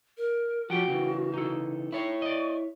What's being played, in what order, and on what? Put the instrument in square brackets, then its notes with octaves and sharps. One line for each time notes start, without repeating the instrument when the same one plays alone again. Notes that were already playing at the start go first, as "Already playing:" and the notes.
[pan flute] A#4
[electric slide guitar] F3 G4 [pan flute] F#4 [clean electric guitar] F#5 G5
[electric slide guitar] C#3 E3
[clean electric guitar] D#4 A4
[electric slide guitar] E4 C#5 [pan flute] C#6
[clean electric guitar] D5 D#5